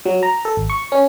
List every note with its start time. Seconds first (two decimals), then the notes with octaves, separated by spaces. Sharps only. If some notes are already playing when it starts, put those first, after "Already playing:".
0.06 F#3
0.23 A#5
0.45 A4
0.57 G#1
0.70 C#6
0.92 C#4